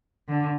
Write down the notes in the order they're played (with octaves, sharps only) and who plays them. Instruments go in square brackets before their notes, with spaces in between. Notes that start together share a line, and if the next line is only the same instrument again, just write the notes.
[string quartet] D3